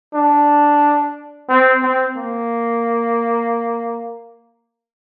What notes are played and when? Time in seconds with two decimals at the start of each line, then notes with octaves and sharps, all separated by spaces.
0.14 D4
1.49 C4
1.83 C4
2.17 A#3